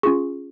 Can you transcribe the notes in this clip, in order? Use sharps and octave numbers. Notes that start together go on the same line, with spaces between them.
C#4 F4 G#4 C#6